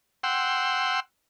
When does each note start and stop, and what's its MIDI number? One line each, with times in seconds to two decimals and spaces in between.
0.23 1.00 78
0.23 1.00 79
0.23 1.00 84
0.23 1.00 88